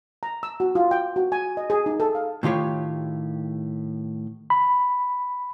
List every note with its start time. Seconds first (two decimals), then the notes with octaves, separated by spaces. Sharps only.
0.23 A#5
0.43 E6
0.60 F#4
0.75 F4
0.91 G5
1.16 F#4
1.32 G#5
1.57 D#5
1.70 G#4
1.86 D#4
2.00 A4
2.15 F5
2.43 A2 D#3 F4 G4 C#5
4.50 B5